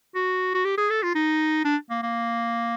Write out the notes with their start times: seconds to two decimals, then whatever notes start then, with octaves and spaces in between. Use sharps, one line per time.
0.15 F#4
0.55 F#4
0.65 G4
0.78 G#4
0.90 A4
1.03 F4
1.15 D#4
1.65 D4
1.90 A#3
2.03 A#3